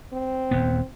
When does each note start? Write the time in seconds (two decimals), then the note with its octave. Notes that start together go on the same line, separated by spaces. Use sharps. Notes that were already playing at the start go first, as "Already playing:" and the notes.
0.13 C4
0.51 D#1 D#2 B3